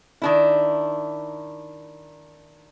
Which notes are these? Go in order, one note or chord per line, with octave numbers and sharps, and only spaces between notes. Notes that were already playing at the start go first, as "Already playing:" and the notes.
D#3 D4 E4